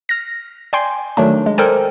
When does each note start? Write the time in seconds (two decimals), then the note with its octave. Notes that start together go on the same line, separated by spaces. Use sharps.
0.09 F6 A#6
0.73 D5 G5 G#5 C6
1.17 D#3 F#3 A3 D4
1.46 G#3
1.58 A4 A#4 C5 D5 G5 G#5